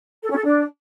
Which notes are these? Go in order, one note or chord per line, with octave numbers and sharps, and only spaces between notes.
A4
C#4
A4
D4